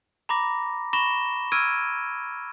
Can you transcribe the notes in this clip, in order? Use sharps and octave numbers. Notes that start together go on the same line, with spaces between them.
A#5 B5 D6 A#6
B5 C#6 A#6 E7 G7
C#6 E6 F6 G#6 D7 D#7